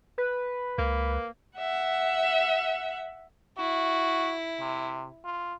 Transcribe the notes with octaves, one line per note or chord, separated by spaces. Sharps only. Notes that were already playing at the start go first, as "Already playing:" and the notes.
B4
C#2 A#3
E5 F#5
E4 F#4
C3
F4